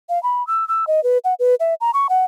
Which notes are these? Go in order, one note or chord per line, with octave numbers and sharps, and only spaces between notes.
F5
B5
E6
E6
D#5
B4
F#5
B4
E5
A#5
C#6
F#5